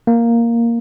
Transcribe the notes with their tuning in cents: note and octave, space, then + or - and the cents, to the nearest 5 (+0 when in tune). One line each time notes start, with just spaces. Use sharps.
A#3 +0